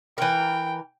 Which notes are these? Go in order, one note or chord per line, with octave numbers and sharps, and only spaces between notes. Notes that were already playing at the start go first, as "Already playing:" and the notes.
E3 A#4 G5